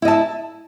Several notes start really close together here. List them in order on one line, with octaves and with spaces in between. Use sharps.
E4 D#5 A5 E5